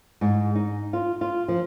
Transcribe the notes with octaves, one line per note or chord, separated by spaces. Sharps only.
G#2
D#4
F4
F4
F3